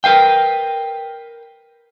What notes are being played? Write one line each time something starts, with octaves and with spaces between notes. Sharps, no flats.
A#4 B4 F5 G5